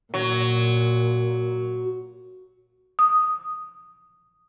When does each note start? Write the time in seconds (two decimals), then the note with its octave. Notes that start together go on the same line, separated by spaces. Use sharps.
0.14 A#2 F#3
2.99 D#6